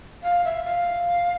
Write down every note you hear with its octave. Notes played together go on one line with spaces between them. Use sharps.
F5
E5
F5